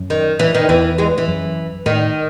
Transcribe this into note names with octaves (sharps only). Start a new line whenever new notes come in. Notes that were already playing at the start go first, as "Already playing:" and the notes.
Already playing: F#2
D#3
E3
D#3
E2 E3
E3 G#3
E3
F#2
A2 D#3